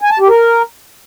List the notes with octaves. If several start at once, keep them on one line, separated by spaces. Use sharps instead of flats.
G#5
A5
G4
A#4